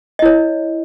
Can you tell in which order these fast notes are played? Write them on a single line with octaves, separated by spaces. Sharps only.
D#5 E4 C#5